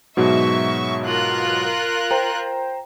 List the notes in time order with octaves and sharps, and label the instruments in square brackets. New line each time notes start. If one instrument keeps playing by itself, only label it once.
[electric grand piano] G#2 B2 F#3 [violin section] E5 C#6
[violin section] F4 A#4 F#6
[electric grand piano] C5 G5 A#5